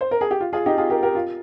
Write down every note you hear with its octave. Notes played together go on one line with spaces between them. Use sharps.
C5
A#4
G#4
G4
F4
F4 G#4
D#4 G4
F4 G#4
G4 A#4
G4 A#4
F4